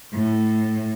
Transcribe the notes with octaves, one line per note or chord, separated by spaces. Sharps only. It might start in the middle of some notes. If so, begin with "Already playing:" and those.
A2